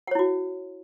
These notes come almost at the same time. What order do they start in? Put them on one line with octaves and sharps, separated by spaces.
F#5 C#5 E4 F#4